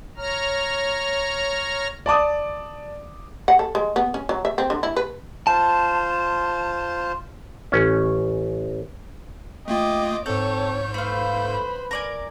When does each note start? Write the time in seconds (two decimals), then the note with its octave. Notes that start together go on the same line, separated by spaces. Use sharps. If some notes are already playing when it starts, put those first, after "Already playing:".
0.17 C#5 A#5 F6
2.06 D5 A5 D6 D#6
3.48 F#5
3.59 A4
3.75 G#3
3.96 B3
4.14 C#4
4.29 F#3
4.45 E5
4.58 C4
4.70 D3
4.83 E4
4.97 B4
5.47 F4 C5 A5
7.72 A1 C#4
9.68 A3 A#3 F4 D#5 G5 D6
10.26 G#2 C4 A4 C#5 G6
10.94 A3 B4 C5 F5 B5
11.91 A#4 D5 G#5